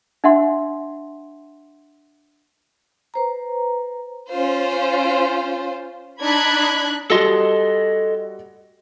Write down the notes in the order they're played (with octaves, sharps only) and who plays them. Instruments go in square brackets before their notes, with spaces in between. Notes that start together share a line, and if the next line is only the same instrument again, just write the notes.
[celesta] D4 E5 F#5 C6
[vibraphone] B4 C5 A#5
[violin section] C#4 F4 C5
D4 D#4 B5 F#6 G#6 B6
[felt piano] G3 F#4 [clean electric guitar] A4 D#5 C6